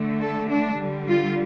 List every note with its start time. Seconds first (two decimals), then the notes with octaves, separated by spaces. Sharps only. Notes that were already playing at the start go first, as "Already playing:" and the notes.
Already playing: D3 A3
0.21 A4
0.50 D4
0.79 D3 G3
1.07 F4